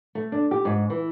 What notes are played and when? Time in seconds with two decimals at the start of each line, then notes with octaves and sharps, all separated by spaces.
0.15 A3
0.32 D4
0.51 G4
0.65 G#2
0.90 E3